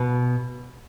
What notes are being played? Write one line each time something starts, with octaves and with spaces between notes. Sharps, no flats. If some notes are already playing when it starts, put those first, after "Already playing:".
Already playing: B2